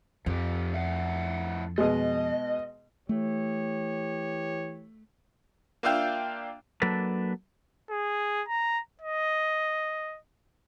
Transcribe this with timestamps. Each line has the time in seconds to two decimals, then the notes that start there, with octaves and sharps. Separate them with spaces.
0.26 F2 F3 G4
0.73 A2 E5 F#5
1.78 B2 G#3 D#5
3.09 E3 A3 G4 C#5
5.83 A#3 D4 F4 E5 F5 G5
6.82 F#3 A#3 D4 A4 B4
7.90 G#4
8.48 A#5
9.02 D#5